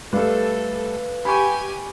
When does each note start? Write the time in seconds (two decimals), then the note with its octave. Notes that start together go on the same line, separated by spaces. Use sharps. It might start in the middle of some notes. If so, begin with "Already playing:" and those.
0.13 G3 A3 A4 B4 F5
1.25 G4 G#5 B5 C#6